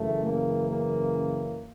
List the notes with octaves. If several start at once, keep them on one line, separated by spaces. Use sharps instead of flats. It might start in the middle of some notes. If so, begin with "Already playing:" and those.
Already playing: F#2 C#3 E3 A3
A#3
A#3